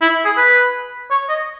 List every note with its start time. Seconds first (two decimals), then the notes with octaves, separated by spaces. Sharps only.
0.01 E4
0.25 G#4
0.37 B4
1.11 C#5
1.29 D#5